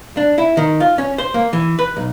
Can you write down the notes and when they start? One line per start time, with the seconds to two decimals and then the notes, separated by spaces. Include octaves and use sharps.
0.17 D4
0.38 E4
0.57 D#3
0.80 F4
0.98 C#4
1.18 C5
1.34 A#3
1.53 E3
1.79 B4
1.97 B1